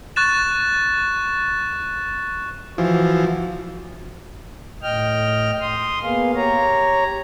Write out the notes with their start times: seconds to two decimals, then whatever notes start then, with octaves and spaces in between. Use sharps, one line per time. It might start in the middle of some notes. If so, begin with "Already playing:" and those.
0.16 C#6 F#6 A6 E7
2.78 E3 F3 F#4
4.82 A2 D#5 G5 F6
5.61 C6 D#6
6.02 A#3 B3 G#4 F5
6.35 G4 C#5 A#5